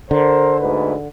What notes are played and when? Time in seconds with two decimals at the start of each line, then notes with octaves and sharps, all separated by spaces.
0.11 D3 A4 A#4 C5
0.60 D2 G#2 B4